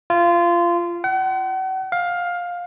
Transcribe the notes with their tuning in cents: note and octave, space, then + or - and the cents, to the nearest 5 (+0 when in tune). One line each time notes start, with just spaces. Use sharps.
F4 -20
F#5 +40
F5 +15